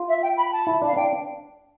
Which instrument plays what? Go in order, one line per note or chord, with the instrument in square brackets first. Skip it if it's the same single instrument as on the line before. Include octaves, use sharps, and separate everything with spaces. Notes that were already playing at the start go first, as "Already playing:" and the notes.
Already playing: [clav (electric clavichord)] F4
[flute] E5
G5
B5
A5
[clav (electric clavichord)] E4
[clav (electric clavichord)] D4 [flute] F5
[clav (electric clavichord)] D4 [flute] G5